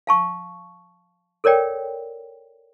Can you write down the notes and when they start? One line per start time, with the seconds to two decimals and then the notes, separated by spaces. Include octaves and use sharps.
0.07 F5 A5 C#6
1.44 A4 A#4 C#5 D5 G5